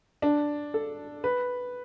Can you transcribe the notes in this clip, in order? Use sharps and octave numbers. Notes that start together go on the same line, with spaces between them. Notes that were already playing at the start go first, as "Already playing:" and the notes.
D4
A4
B4